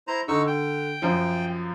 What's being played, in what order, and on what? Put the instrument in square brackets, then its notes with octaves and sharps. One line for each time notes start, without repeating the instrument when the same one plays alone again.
[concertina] E4 C5 A#5
[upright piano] D3 [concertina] D#4 C#6 E6
[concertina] G5
[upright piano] F#2 F3